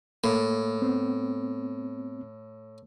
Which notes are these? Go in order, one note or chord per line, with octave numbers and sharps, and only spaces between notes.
A2 A#3
B3 C4